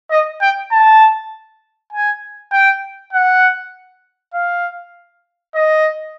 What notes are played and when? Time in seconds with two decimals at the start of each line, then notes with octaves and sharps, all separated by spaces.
0.10 D#5
0.41 G5
0.72 A5
1.93 G#5
2.52 G5
3.13 F#5
4.34 F5
5.55 D#5